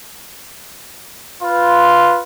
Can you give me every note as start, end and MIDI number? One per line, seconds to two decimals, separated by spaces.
1.43 2.21 65
1.43 2.21 71